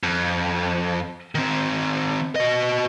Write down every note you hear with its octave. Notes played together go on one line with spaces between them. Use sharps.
F2
D#3 C4
F#4 D#5